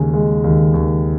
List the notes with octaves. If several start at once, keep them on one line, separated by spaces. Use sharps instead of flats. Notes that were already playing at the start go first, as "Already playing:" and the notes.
Already playing: D#2 C#3 G#3
G#3
D#2
D#2